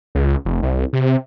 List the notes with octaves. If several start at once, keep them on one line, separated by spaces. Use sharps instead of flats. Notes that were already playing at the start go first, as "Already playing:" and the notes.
C#2
F1
C2
C3